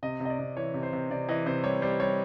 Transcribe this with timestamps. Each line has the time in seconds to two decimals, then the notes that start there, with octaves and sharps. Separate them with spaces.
0.03 C3 D#5
0.20 C3
0.25 D#5
0.30 D5
0.39 C3
0.57 E3 C#5
0.74 C3
0.83 C5
0.93 C3
1.11 C3 D5
1.28 E3 D#5
1.46 C3 C5
1.64 G3 C#5
1.82 G3 C5
2.00 G3 C#5